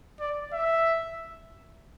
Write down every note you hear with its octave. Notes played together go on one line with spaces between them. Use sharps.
D5
E5